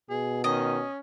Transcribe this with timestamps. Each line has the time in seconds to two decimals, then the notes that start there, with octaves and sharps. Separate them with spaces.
0.10 B2 G#4
0.44 D#3 C#4 D#5